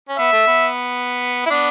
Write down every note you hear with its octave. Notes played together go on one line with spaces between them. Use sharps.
C#4
B3 E5
A3
B3
E4
B3 D4